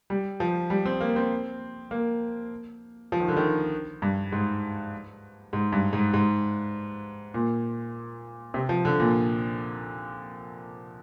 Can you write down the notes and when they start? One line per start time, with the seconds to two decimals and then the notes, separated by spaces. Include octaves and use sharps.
0.10 G3
0.40 F3
0.70 G3
0.86 C4
1.01 A#3
1.16 C4
1.91 A#3
3.12 F3
3.20 D#3
3.28 D3
3.36 D#3
4.02 G2
4.32 G#2
5.53 G#2
5.72 G2
5.93 G#2
6.14 G#2
7.34 A#2
8.54 C3
8.69 F3
8.85 D3
9.00 A#2